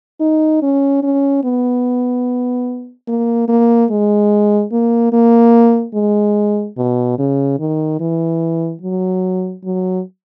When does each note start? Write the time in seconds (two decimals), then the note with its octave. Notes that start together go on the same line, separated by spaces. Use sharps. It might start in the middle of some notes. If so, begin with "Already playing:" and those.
0.20 D#4
0.62 C#4
1.03 C#4
1.44 B3
3.08 A#3
3.48 A#3
3.90 G#3
4.72 A#3
5.13 A#3
5.94 G#3
6.77 B2
7.18 C#3
7.59 D#3
8.00 E3
8.81 F#3
9.64 F#3